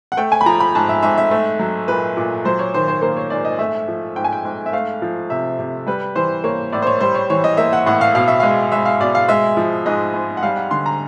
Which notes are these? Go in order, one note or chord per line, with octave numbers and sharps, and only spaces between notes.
F#5
A3 G5
G#5
B5
F3 A#5
B5
G#2 A5
E5
G#2 E5
E5
A3
F#3
A#2 B4
A#2
F#3 C5
C#5
D#3 C5
C5
A#3 C5
C#5
G#2 D5
D#5
A3 E5
F3
G#2 G5
G#5
G5
G#2
E5
A3 F5
F3
C3 E5
C3
G3 B4
E3 C5
A#3 C#5
A2 D5
C5
C#5
G3 C5
C#5
E3 C#5
D#5
A#3 E5
F#5
A2 F#5
F5
B2 F5
E5
G#3 F5
G#3 E5
F5
B2 D5
F5
G#3 E5
F3
G#2 D#5
G#2
F#5
G3 F5
F#5
D3 C6
A#5